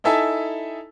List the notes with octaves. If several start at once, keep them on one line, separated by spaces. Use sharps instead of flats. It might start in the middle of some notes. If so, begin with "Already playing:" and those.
D#4 E4 A4 E5 G#5 A5